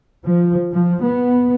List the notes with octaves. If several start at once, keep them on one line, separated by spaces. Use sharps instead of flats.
F3
F3
B3